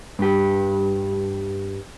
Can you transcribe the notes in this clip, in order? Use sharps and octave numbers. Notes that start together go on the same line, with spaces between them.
G2 G4